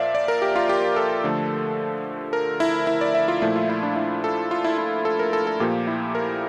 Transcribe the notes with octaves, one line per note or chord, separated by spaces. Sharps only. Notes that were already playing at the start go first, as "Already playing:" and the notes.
Already playing: A#2 F3 A#3 D5 E5 F5
D5
A#4
G4
F4
G4
A4
D3 F3 A3
A#4
E4
E4
D5
E5
F4
A#2 F3 A3 E4
F4
E4
D4
E4
A4
F4
E4
E4
A4
A#4
A4
A4
A#2 F3 A#3 G4
E4
A#4